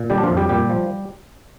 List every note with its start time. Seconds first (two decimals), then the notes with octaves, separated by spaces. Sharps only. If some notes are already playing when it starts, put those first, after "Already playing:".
Already playing: A#2
0.10 D3 G3 G4
0.18 D4
0.23 F3 F4
0.30 F2
0.37 G3 G4
0.49 A#2 G3 G4
0.70 F3